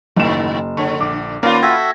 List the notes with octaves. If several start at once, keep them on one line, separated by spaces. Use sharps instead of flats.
F#1 G#2 D#3 E7
D3 C#5 A5 C#6
A#1 D6
D#3 A#3 B3 C#4 F4 D5 F5 A#5
F#4 A4 E5 G5 G#6 A#6